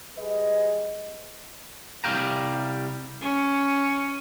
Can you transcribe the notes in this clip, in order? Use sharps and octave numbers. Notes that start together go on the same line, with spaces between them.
G3 G#4 B4 D#5
C2 F2 G3 F5 G5 A#5
C#4